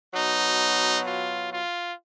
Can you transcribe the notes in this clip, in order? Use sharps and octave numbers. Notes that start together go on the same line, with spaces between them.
B2 F#3 D#4
F4
F4